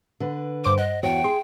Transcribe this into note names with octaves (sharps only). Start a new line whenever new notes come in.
D3 B4
G2 C5 D6 D7
D#5 F#5
E2 F#4 C#5 G5
G#4 C6